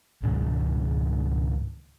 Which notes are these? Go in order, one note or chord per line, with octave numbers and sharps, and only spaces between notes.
C#2 G#2 B2 D#3